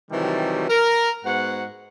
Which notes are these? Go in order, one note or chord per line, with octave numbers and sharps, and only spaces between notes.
C3 D#3 E3 F#3 G3 A3
A#4
G#2 B3 F#4 F#5